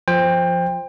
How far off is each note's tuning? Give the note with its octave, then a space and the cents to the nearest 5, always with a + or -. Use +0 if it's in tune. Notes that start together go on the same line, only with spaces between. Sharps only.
F3 +0 C5 +0 G5 +25